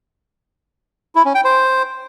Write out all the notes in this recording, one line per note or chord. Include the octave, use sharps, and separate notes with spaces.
E4
C#4
G5
C5